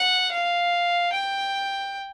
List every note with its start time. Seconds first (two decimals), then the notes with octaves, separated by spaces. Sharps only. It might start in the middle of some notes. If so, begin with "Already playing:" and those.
Already playing: F#5
0.32 F5
1.12 G5